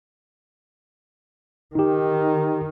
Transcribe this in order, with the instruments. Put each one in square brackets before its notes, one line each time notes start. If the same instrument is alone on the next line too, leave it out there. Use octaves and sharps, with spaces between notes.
[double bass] D#3 [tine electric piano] D#4 G4